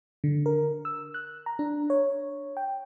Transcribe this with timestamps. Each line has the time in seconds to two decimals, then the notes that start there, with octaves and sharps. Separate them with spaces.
0.24 D3
0.46 A#4
0.85 E6
1.14 F#6
1.46 A#5
1.59 D4
1.90 C#5
2.57 G5